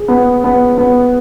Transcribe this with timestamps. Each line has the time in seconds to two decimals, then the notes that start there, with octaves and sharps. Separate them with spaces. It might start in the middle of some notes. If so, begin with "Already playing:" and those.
Already playing: G#4
0.08 B3
0.44 B3
0.78 B3